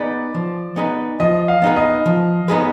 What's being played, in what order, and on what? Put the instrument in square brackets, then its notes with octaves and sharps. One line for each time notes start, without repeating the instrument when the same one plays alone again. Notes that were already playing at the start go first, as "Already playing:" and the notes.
Already playing: [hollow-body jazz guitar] B3 D#4 G#4 B4 [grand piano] D5
[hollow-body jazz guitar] F3
B3 D#4 G#4 B4
[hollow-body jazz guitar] F3 [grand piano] D#5
[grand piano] F5
[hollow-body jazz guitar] B3 D#4 G#4 B4
[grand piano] D#5
[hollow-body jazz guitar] F3
B3 D#4 G#4 B4